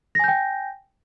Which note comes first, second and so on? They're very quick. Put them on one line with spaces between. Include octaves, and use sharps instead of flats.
A#6 G#5 G6 G5